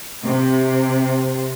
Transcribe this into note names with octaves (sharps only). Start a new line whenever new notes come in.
C3